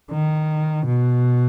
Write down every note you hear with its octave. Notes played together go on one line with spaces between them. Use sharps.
D#3
B2